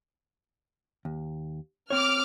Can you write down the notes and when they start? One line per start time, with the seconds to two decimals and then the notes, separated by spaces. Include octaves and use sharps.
1.05 D#2
1.90 C4 C5 C#5 D6 F6